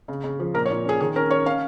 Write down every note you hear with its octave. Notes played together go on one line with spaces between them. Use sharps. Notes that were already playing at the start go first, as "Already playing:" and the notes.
C#3
C#3
F3
A#2 A#4
C#5
A#2
C#4 G#4
D#3 G#4
C#4 A#4
C#4 C#5
C#4 F5